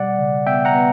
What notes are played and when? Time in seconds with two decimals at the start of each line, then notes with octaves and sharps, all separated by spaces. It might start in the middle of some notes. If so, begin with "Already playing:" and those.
Already playing: B2 G3 D5 F#5
0.19 C#3
0.47 B3 E5 G5
0.65 F#5 A#5
0.75 B3